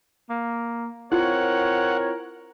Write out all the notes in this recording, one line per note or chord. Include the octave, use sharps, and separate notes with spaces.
A#3
C4 E4 F4 A#4 C#5 F#5